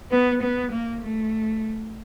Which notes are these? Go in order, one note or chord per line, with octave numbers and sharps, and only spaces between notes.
B3
B3
A#3
A3